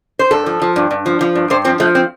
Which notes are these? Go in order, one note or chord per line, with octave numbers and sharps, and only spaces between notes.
C5
G2 A4
F3
F3
G2
G2
F3
F3
G2
G2 C5
F3 C4
F3 A3
C4